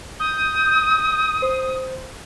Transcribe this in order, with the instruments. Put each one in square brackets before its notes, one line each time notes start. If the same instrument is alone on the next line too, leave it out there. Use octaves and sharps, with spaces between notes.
[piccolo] D#6 [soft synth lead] G6
[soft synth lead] C5